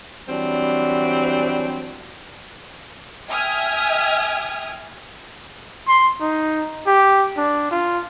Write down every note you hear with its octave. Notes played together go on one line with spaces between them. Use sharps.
E3 F#3 G3 C4 D4
E5 G5 G#5 D#6 F6 G#6
C6
D#4
G4
D4
F4